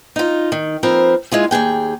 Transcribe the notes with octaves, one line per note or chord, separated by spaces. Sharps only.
D#4 F4
D#3
F3 C4 A#4 B4
G#3 E4 F4 G#4
D#2 F#3 G#4 G5